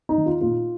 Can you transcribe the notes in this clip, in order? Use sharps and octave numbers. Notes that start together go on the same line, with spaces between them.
D#4
D#3
F4
A#2 F4